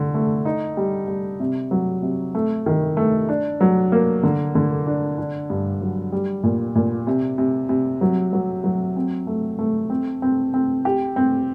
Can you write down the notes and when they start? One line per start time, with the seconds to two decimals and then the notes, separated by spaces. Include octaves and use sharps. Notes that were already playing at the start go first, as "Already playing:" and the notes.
Already playing: D3
0.14 A3
0.45 D#4
0.77 G3
1.08 G3
1.40 C3
1.71 F#3
2.02 C3
2.35 A3
2.66 D#3
2.97 A3
3.29 D4
3.61 F#3
3.92 A#3
4.23 D3
4.55 D3
4.87 D4
5.18 D4
5.50 G2
5.81 F#3
6.12 G3
6.44 A#2
6.76 A#2
7.07 C3
7.38 C3
7.69 C3
8.01 F#3
8.33 F#3
8.64 F#3
8.96 C4
9.27 A3
9.59 A3
9.90 C4
10.22 C4
10.54 C4
10.85 G4
11.16 C4